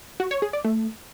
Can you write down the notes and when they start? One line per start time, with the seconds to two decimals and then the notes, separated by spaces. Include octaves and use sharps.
0.20 F#4
0.31 C#5
0.42 G#4
0.53 D5
0.64 A3